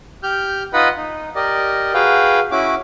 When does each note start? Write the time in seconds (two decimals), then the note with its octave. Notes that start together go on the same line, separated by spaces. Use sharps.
0.23 G4 F6 G6
0.73 D#4 F4 B4 D#5 F#5 B5
0.97 D#4
1.35 G4 A#4 D5 D#5
1.94 F#4 G#4 B4 F5 G5
2.52 C#4 E4 F#4 D6